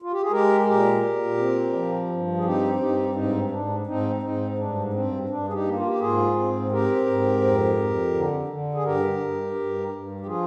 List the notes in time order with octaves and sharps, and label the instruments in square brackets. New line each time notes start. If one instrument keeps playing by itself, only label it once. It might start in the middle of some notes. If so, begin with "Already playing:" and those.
[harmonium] F4
G4
G#4
G#3 G4 A#4
A#2 G4 A#4
A#2
C4
F3
G2
G#4
C4 D#4 G4
G2 D#4 G4
G#2 C4 D#4
G#2 D4
G#2 C4 D#4
G#2 C4 D#4
G2 D4
G2 C4
G2 D4
G#4
D#4 G4
A#3
F4
G4
G#2 F4 G#4
C4
C4 G4 A#4
G#2
F2
F2
D3
D3
G#4
G2 G4 A#4
G2
G2
G2
G4
F3 F4 G#4